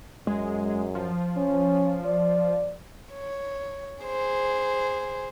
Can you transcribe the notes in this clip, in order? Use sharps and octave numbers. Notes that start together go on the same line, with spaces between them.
F#2 G#3
F3
C#4
D5
C#5
G#4 C5